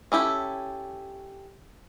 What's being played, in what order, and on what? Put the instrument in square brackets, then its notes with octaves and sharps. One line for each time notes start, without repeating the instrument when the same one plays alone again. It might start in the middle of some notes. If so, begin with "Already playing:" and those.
[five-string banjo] C#4 E4 G4 A4